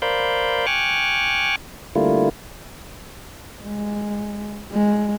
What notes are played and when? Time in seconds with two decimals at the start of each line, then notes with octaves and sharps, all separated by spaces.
0.02 A#4 C5 D5 F5 B5 G6
0.67 G5 G#5 C#6 D6 F6 F#6
1.95 D3 G3 A3 A#3 E4 F4
3.64 G#3
4.72 G#3